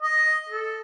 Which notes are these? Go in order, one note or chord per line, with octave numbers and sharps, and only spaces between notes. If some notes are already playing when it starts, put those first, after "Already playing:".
D#5
A4